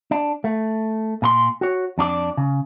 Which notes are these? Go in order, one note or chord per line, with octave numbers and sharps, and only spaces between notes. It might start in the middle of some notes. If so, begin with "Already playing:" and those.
D4
A3
A#2 A#4 C6
F#4 C#5
F2 D4 F#4 D5
C#3